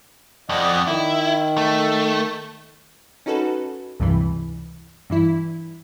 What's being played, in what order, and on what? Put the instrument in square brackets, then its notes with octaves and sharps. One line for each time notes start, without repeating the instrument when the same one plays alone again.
[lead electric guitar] F2 [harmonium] D5 D#5 F#5
[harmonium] D#3 [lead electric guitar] E4
[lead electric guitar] A3
[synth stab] C#4 D#4 F#4 A4 B4
C#2 G2 C3 E3
G2 E3 E4